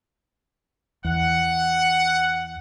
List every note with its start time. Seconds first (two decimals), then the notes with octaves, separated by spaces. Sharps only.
1.04 E2 F#5